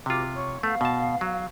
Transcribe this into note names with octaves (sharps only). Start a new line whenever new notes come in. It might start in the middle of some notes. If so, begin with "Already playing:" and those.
C2 C3 F4 F#4 D6
C#5 C#6
A3 B3 F5
B2 A5
F#3